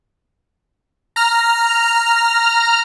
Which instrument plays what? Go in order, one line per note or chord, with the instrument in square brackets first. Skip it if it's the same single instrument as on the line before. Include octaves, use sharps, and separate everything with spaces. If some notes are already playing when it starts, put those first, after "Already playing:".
[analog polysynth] A#5 F6